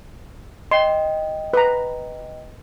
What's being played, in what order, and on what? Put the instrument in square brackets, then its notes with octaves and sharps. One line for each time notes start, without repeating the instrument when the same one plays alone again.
[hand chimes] D#5 G5 [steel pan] C6
[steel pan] B4 A#5